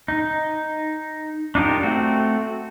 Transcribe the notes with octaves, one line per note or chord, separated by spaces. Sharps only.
D#4
D4 D#4 F4 G4 A#4
A3 C4 F#4